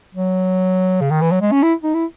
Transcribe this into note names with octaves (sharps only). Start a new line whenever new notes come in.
F#3
C#3
D#3
E3
F#3
G#3
C#4
E4
D#4
E4